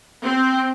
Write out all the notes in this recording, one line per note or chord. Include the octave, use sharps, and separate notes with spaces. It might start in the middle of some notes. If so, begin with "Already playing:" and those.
C4